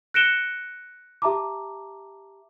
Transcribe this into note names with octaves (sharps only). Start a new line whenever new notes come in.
F#6 A#6 C#7 D7 E7 G7
G4 E5 A5 A#5 D6